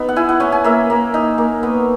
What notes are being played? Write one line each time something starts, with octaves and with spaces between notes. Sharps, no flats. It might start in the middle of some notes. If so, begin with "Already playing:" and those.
Already playing: B3 D#4
F#5
E4 G#5
F#5
C#4 G#5
G#5
A#3 E5
A#3
D#4
A#3
B3